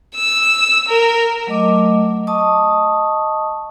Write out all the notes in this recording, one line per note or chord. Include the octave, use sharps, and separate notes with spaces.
E6
A#4
F#3 A3 D#5 D6
D#5 A5 C#6 D#6